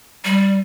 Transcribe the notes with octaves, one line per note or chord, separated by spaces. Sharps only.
G3